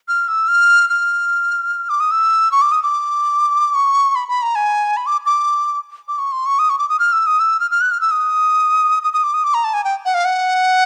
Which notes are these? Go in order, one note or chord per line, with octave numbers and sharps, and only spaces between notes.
F6
E6
F6
F6
D6
D#6
E6
C#6
D6
D#6
D6
C#6
B5
B5
A#5
G#5
B5
D6
D6
D6
C#6
C6
C#6
D#6
C#6
D6
D#6
F6
E6
D#6
E6
F6
F6
F#6
F6
E6
D#6
D#6
D#6
D6
D#6
D6
A#5
A5
G#5
G5
F#5
F5
F#5